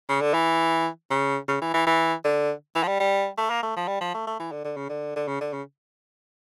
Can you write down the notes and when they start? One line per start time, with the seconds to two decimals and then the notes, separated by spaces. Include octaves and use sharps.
0.09 C#3
0.22 D3
0.34 E3
1.10 C#3
1.48 C#3
1.62 E3
1.74 E3
1.87 E3
2.25 D3
2.75 E3
2.83 F3
2.88 G3
3.00 G3
3.38 A3
3.50 A#3
3.63 A3
3.77 F3
3.88 G3
4.01 F3
4.14 A3
4.27 A3
4.40 E3
4.52 D3
4.65 D3
4.77 C#3
4.89 D3
5.16 D3
5.28 C#3
5.41 D3
5.53 C#3